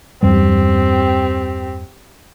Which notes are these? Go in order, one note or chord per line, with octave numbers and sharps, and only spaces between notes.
E2 G2 G3 C4 G4